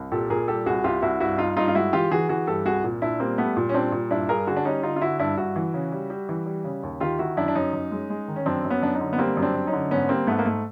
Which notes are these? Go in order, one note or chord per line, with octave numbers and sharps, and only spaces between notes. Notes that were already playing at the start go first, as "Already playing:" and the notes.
Already playing: C2
A#2 G4 A4
A#2 G#4 A#4
G3 G4 A4
C2 F#4 G#4
C2 F4 G4
C2 E4 F#4
G2 E4 F#4
G2 D#4 F4
G2 D#4 F4
F4
G#3 E4 F#4
E3 F4 G4
E3 F#4 G#4
E3 F#4 G#4
G2 G4 A4
C2 F#4 G#4
A#2
A#2 D4 E4
G3 A#3 C4
G3 A3 B3
A#2
C#4
G3 C4 D4
A#2
G2 D4 E4
G2 G#4 A#4
D3 F#4 G#4
D4
G3 C#4 D#4
D3 D#4 F4
F4
D3 E4 F#4
G2 D4 E4
G2 E4 F#4
E3
C#3
G3
G3
E3
G3
C#3
D#2
D#3 F4 G4
D#3 E4 F#4
F#2 D4 E4
D4
F#2 C#4 D#4
F#2
G#3
G#3
D#3
C#4
F#2 C4 D4
F#2
B3 C#4
F#2 D4
C#4 D#4
D3
B3
G3 A#3 C4
F#2
C4 D4
F#2
C#4 D#4
D3
G#2 B3 C#4
G3 A#3 C4
G#2 A3 B3
A#3
G#2 A3